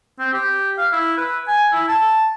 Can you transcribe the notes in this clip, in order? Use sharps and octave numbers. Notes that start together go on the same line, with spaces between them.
C4
G4
F5
E4
B4
G#5
E4
A5